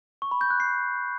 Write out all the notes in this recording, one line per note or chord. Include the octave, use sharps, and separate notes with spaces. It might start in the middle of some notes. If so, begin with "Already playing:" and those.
C#6
B5
G6
F#6
C7